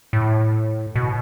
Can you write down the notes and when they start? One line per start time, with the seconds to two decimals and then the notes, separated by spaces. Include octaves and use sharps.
0.13 A2
0.96 B2